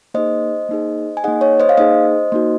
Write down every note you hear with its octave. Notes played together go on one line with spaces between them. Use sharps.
A#3 D#4 G#4 C5 D#5
A#3 D#4 G#4
G#5
A#3 D#4 G#4 D#5 F#5
C#5
C5 D#5
F5
A#3 D#4 G#4 C5 D#5
A#3 D#4 F#4